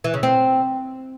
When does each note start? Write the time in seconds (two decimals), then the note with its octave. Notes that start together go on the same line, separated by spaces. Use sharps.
0.04 E3
0.14 C#3
0.23 C4